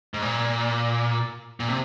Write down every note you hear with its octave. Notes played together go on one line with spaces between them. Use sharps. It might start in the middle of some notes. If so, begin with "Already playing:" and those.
G#2
A#2
A#2
C3